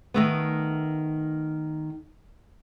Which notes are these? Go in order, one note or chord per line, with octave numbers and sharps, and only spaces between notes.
D#3 A3 B3